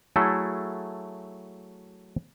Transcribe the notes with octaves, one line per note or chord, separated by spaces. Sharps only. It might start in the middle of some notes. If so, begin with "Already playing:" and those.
F#3 A3 E4 G#4 A4